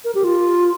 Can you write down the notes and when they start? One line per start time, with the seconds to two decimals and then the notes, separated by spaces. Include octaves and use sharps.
0.05 A#4
0.15 G4
0.24 F4